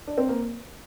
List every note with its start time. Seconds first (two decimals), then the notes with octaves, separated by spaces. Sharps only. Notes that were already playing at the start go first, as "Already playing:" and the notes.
0.07 D4
0.18 C4
0.29 A#3